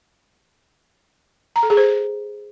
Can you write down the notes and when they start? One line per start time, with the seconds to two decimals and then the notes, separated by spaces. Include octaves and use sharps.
1.56 A#5
1.63 A4
1.70 G#4
1.77 C5